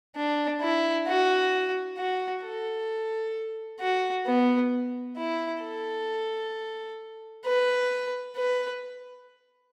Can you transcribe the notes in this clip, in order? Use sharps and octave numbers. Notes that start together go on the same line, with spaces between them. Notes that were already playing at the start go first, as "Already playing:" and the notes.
D4
E4
F#4
F#4
A4
F#4
B3
E4
A4
B4
B4